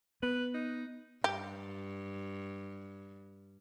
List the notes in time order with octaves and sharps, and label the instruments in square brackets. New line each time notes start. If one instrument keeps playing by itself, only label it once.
[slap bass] B3 [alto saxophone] B4
[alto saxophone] D#4
[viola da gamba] G2 [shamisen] G4